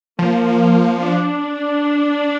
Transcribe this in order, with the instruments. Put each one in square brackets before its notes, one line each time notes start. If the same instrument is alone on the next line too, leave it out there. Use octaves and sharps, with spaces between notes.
[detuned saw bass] F3 [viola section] A#3
[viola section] D4